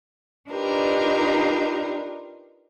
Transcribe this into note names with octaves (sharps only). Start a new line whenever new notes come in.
D4 D#4 F4 G4 A#4 B4